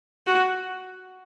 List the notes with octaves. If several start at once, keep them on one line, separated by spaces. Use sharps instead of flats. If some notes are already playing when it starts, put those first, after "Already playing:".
F#4